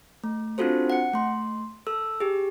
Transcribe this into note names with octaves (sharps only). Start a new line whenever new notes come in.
A3
C4 D4 F4 F#4 A4 C5
F#5 C#7
A3 C6
A4 E6
G4 G#4